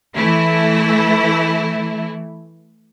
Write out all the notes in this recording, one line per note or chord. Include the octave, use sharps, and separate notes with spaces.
E3 A3 E4